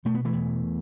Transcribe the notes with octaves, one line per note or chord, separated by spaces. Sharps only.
B2 A3
B3
E3 A3
E2